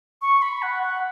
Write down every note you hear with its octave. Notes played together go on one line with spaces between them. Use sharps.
C#6
B5
F#5
F#5